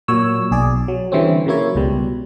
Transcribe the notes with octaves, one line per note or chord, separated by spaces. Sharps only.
A#2 F#3 C#5 E6
B1 G#4 D5
F#3
D3 E3 G3 C4 C#4
C#3 F#3 A#3 E4 C#5
C#2 B2 G3